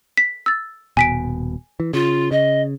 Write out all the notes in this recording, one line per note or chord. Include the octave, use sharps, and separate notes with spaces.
B6
E6 A6
D#1 B2 G#5 B6 D7
E3
C#3 F4
C#3 D#5